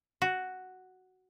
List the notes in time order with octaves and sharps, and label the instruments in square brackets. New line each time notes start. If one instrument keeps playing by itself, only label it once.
[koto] F#4